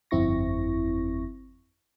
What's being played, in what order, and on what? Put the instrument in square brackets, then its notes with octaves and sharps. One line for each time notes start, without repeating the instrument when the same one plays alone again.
[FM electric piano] G1 F2 C4 E4 C#6 A#6